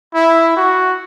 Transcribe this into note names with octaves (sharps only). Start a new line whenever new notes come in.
E4
F#4